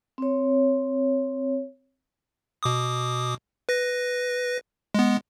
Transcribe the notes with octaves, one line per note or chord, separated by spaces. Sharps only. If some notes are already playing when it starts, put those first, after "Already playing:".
C4 C#5
B2 D6 D#6
B4 A#6
G#3 B3